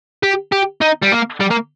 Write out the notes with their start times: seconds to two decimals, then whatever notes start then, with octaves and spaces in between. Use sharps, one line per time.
0.23 G4
0.52 G4
0.81 D#4
1.03 G3
1.12 A#3
1.41 G3
1.51 A#3